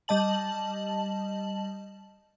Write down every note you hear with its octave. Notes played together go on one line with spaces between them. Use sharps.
G3 D#5 A5 F#7